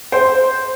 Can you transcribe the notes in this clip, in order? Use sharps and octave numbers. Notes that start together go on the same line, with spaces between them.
C5